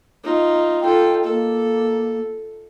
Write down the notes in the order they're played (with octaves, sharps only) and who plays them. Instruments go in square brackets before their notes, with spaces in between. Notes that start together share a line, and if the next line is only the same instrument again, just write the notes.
[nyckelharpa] D#4 F4
[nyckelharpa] F4 A4 [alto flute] G5
[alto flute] A#3 [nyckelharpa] A4